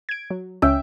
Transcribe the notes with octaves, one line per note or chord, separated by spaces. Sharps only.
G#6 D7
F#3
C#2 C#4 E5 G5